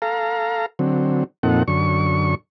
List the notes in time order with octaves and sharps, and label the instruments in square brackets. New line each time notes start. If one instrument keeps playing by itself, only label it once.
[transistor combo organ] A4 F5 A#5
D3 F#3 C4
F2 A#2 C4 D#4 A4 F#5
F#2 D3 C#6